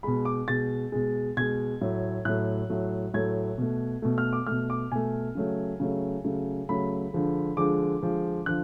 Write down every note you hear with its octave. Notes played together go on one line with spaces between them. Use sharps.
B2 G#3 B5
D6
B2 G#3 A6
B2 G#3
B2 G#3 G#6
A2 F#3 A3
A2 F#3 A3 F#6
A2 F#3 A3
A2 F#3 A3 G#6
B2 A3
B2 A3
F6
D6
B2 A3 F6
D6
B2 A3 G#5
C#3 F#3 A3
C#3 F#3 A3
C#3 F#3 A3
C#3 F#3 A3 B5
D3 F3 G#3
D3 F3 G#3 D6
D3 F3 G#3
D3 F3 F#6